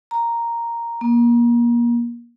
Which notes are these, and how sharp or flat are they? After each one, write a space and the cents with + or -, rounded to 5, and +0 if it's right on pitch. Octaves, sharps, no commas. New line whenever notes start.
A#5 +0
A#3 +30